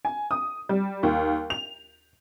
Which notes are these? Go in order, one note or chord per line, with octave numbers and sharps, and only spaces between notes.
G#5
D#6
G3
D#2
F7